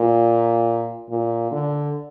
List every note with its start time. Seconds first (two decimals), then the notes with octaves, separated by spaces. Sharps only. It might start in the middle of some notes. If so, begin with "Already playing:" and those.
Already playing: A#2
1.10 A#2
1.52 D3